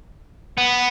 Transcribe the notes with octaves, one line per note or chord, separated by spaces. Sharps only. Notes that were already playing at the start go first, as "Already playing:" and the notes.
B3